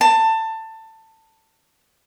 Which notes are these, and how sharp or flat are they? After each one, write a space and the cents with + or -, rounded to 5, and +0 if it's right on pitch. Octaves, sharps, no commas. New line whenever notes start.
A5 +20